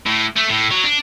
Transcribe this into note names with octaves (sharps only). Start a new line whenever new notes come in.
A2
A3
A2
F#3
D4